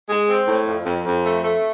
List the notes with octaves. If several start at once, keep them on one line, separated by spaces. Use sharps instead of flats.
G#3
C4
A2
F2
F2
F2
A3
A3